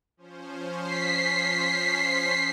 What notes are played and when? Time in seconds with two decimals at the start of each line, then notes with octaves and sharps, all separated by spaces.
0.17 F3 C#4 C5
0.83 B6 C7